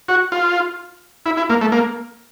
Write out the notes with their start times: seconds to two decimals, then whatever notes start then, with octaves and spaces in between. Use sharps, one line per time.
0.09 F#4
0.32 F4
1.26 E4
1.37 E4
1.50 A#3
1.61 A3
1.72 A#3